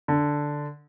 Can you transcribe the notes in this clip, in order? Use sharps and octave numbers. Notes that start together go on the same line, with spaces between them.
D3